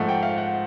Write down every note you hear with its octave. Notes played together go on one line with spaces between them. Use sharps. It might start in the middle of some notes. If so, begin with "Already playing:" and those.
Already playing: G#2 F3 A3 F#5
G5
F5
F#5